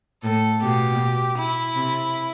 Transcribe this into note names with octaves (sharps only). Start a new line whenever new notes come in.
A2 A4
B2 G4
E4
C3